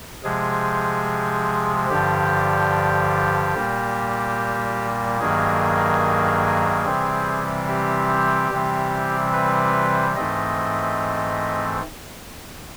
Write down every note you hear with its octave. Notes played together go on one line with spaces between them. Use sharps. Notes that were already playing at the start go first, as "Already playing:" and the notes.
C3 F3 G#3 G#4
G2 D3 F3 G4
A#2 G3 A#3
G2 D#3 F#3 A#3 G#4
C3 E3 G3 C4
G4
C3 E3 G3 C4
B4
G#2 E3 A3 C4 D#5